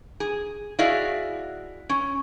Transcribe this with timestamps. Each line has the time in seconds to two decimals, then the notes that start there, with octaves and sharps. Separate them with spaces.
0.20 G#4
0.79 E4 F#4 G#4 D5 D#5 F5
1.89 C#4